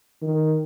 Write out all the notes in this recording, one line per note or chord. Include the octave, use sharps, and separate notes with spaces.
D#3